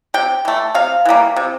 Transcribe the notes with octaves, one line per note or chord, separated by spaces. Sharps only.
C3 G5
E3 A3
C3 F5
E3 G3 A#3
C3